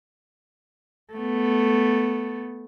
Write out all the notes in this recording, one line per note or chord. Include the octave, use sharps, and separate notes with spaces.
A3 B3